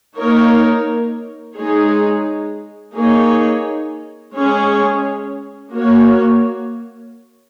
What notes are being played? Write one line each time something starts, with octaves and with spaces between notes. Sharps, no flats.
A#3 D#4 A#4 C#5
G#3 D#4 G#4 C#5
A#3 D#4 G#4 C#5
G#3 C#4 G#4 C#5
A#3 F#4 C#5